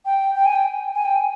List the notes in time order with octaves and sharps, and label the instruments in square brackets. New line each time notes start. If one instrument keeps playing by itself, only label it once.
[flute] G5
G5
G#5
G5
G#5
G5
G#5